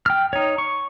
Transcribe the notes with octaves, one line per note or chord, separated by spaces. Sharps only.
G5 F6
D#4 C#5
C#6